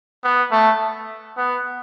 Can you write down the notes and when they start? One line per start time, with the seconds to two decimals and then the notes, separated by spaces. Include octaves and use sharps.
0.24 B3
0.51 A3
1.37 B3